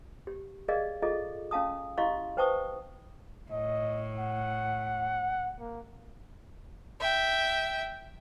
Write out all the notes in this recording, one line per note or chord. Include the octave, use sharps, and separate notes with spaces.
G4
G#4 A#4 D5 D#5 F5
F4 G#4 A4 D#5
C#4 F5 A5 D#6
E4 G4 D#5 F5 C6 C#6
B4 C5 G5 A5 C#6 D#6
A2 D#5
F#5
A#3
E5 G5